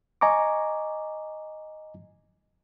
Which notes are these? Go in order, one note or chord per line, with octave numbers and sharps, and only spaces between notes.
D#5 G#5 A#5 C#6 D6